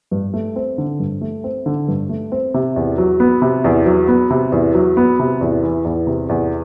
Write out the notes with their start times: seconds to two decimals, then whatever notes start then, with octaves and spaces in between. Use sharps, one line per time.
0.11 G2
0.34 A3
0.56 C4
0.78 D3
1.00 G2
1.21 A3
1.44 C4
1.66 D3
1.88 G2
2.09 A3
2.32 C4
2.54 C3
2.76 E2
2.98 F#3
3.20 B3
3.42 C3
3.64 E2
3.86 F#3
4.08 B3
4.30 C3
4.52 E2
4.75 F#3
4.97 B3
5.19 C3
5.41 E2
5.63 E3
5.85 E2
6.07 C3
6.29 E2